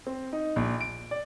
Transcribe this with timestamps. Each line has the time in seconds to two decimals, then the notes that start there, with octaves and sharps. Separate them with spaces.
0.07 C4
0.33 D#4
0.56 A#1
0.80 D7
1.11 D5